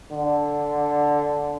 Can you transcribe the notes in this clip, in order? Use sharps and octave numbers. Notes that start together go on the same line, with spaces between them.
D3